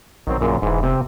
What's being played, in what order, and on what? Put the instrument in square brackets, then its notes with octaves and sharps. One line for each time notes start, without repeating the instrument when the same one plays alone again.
[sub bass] A#1 [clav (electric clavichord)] D#3 F#3 C4
[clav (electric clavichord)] F#2 A#2 C#3
[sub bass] E1 [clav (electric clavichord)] G#2 E3
[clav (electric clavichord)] C3 C4